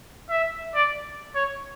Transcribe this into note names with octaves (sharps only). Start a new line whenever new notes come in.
E5
D5
C#5